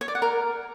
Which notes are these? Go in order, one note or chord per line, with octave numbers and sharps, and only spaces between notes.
C#5
D5
F#5
A#4